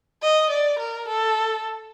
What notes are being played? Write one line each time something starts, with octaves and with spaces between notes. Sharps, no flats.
D#5
D5
A#4
A4